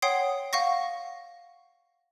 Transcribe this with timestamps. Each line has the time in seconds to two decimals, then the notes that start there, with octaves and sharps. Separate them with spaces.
0.02 C#5 F#5 G5 C6 D#6 C7
0.53 F5 F#5 C#6 A#6